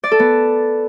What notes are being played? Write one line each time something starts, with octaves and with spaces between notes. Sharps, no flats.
D5
A4
B3